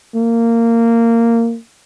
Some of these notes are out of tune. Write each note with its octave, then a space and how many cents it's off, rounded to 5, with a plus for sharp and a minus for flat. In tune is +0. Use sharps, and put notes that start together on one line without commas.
A#3 -15